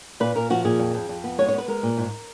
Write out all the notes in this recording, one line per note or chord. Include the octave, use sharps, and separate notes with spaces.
A#2 B4
A#2 A#4
F3 F#4
A#2 G#4
F2
F2
F2
B3
G#3 C#5
C#5
B3
B4
G#3 A#4
A#2
G#2